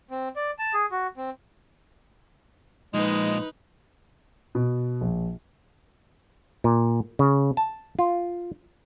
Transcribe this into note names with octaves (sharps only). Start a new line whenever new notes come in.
C4
D5
A5
G#4
F#4
C4
A#2 F3 G#3 D#4 B4
B2
A#1
A#2
C#3
A5
F4